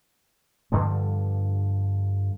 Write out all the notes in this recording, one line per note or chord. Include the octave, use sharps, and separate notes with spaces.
G2 D3 F3 G3